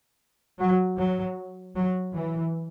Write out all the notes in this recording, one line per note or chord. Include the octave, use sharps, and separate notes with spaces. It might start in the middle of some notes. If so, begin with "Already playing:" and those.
F#3
F#3
F#3
E3